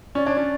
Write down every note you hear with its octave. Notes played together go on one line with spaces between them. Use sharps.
C#4 D5
D4 C#5
C#4 D5